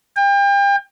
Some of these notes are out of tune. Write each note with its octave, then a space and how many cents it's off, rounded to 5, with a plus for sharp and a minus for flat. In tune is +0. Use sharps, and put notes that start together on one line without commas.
G5 +35